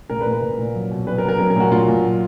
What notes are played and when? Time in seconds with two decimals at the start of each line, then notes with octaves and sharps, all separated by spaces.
0.10 A#2 A#4
0.21 B4
0.26 A#2
0.32 B4
0.42 A#2
0.58 A#2
0.75 F#3
0.91 B2
1.07 F#3 B4
1.18 A#4
1.23 B2
1.29 A#4
1.40 F#3 A#4
1.50 A#4
1.56 A#2 F#4
1.71 A#2 F4
1.88 A#2
2.05 F#3